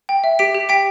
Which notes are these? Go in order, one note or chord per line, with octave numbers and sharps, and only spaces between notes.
G5
E5
G4 B6 D7
G4
G5 B6 D7